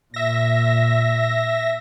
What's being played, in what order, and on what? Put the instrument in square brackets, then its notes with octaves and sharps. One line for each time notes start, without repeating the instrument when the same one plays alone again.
[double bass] A#2 [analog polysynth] E5 A#6